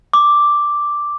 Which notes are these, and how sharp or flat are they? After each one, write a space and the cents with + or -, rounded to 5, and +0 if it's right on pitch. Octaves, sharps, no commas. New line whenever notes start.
D6 +0